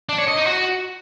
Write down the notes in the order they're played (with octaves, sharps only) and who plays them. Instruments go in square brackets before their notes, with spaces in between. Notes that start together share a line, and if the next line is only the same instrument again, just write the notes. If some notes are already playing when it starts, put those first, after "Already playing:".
[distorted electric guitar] D4
C#5
D#5
D#4
F#4